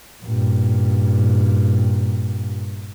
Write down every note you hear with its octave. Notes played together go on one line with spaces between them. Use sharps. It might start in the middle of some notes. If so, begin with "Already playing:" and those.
G2 A#2